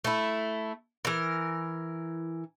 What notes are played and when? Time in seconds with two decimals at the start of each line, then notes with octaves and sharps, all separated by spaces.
0.04 A3 E4
1.05 E3 A#4